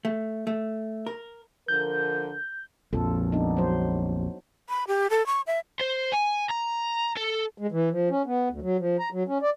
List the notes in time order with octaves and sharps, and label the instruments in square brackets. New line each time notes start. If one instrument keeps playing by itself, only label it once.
[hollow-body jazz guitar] A3
A3
A#4
[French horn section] D3 F3 A#4 [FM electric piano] G6
[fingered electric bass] A#1 F2 [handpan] F4 A4
[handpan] B3 D4 D#4
F#3 C5
[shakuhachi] B5
G4
A4
C#6
E5
[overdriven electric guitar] C5
G#5
A#5
A4
[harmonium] G#3
E3
F3
C#4
B3
D2
F#3
F3
A#5
F#3
C#4
D5